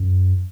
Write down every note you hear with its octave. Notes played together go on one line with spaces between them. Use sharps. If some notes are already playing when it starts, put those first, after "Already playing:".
Already playing: F#2